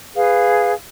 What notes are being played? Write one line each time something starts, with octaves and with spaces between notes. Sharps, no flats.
G#4 B4 F5